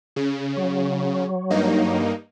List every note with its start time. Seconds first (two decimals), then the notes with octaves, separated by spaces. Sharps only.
0.16 C#3
0.57 F#3
1.50 G2 A#3 D#4